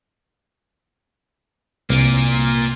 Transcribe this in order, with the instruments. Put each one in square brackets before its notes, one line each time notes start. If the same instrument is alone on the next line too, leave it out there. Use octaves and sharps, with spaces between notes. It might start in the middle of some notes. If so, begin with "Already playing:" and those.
[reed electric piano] C2 [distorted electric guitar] A#2 A#3